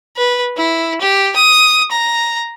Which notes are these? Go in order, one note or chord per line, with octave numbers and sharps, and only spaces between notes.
B4
E4
G4
D#6
A#5